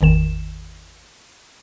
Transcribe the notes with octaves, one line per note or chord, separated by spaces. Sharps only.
G#1 E2 D#3 E7